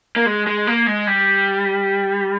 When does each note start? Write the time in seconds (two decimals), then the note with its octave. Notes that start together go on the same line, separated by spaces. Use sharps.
0.16 A#3
0.26 G#3
0.47 G#3
0.67 A#3
0.87 G#3
1.07 G3